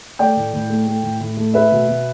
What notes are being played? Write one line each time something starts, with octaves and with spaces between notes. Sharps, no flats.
A3 D5 G5
A2
A2
A3
A3
A2
A2
A3
A3 B4 E5
B2
B2